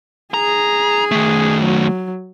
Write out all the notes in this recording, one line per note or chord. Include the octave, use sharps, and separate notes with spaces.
G#4 A#5
D#3 A3
F#3